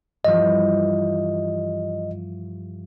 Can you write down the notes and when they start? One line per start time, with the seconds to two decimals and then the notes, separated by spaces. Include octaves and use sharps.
0.25 G2 E3 F3 D#5